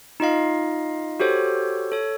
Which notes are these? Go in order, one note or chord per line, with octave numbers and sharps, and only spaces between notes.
D#4 F4 D#5 F5
F#4 G4 A4 C5 C#5
A4 C#5